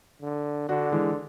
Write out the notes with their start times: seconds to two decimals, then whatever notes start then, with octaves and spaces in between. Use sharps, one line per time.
0.22 D3
0.69 D3 D4 F#4
0.92 E3 G#3